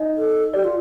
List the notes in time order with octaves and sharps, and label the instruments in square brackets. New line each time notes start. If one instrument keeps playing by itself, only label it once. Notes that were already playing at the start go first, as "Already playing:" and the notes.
Already playing: [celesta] D#4 D#5
[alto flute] A4
[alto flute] G4 [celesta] D5
[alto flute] F4